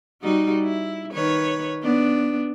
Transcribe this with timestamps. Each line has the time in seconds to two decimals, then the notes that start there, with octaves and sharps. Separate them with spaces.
0.22 G3 D#4 F#4
0.63 E4
1.13 D#3 B4 C#5
1.83 B3 D4